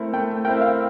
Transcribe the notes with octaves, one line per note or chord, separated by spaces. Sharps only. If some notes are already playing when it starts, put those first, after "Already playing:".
Already playing: A3 C4 E4 A#4
A3 G5
C4 E4 A#4 G5
E5
F5